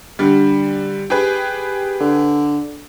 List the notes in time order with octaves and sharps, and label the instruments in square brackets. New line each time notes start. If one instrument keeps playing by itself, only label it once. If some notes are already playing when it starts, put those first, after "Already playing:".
[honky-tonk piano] D3 G3
G4 G#4 B4
[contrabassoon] D3